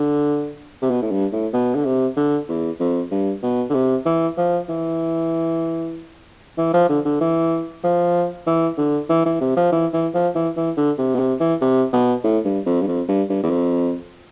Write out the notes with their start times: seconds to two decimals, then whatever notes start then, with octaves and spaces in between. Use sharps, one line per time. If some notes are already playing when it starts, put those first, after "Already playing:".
Already playing: D3
0.82 C3
0.91 B2
1.02 A2
1.12 G2
1.33 A2
1.53 B2
1.75 D3
1.85 C3
2.17 D3
2.49 E2
2.80 F2
3.11 G2
3.42 B2
3.70 D3
3.74 C3
4.06 E3
4.37 F3
4.69 E3
6.58 E3
6.74 F3
6.89 D3
7.05 D3
7.20 E3
7.83 F3
8.46 E3
8.78 D3
9.09 E3
9.25 E3
9.41 C3
9.56 F3
9.72 E3
9.93 E3
10.14 F3
10.35 E3
10.57 E3
10.77 D3
10.98 C3
11.15 B2
11.19 C3
11.40 E3
11.61 C3
11.93 B2
12.24 A2
12.45 G2
12.66 F2
12.82 G2
12.87 F2
13.08 G2
13.30 G2
13.43 E2
13.50 F2